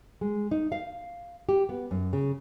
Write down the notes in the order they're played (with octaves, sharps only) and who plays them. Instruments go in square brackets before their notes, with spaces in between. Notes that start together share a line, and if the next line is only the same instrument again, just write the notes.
[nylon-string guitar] G#3
D#4
F5
G4
B3
F#2
C#3